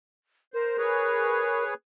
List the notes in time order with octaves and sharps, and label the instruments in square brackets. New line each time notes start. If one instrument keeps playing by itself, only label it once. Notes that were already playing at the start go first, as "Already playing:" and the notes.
[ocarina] A#4 [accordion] C5
[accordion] G#4 B4 C#5